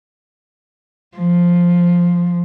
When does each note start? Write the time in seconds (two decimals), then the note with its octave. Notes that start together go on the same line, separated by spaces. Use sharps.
1.17 F3